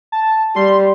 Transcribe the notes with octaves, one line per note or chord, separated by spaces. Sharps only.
A5
G3 C6